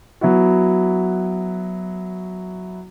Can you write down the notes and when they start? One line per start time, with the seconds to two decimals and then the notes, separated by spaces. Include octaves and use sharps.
0.21 F#3 B3 E4 F#4